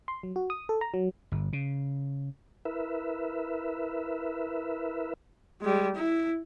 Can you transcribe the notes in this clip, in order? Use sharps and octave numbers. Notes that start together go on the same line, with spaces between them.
C6
F#3
F#4
D#6
A4
A#5
F#3
G1
C#3
E4 A#4 B4 E5
G3 G#3
E4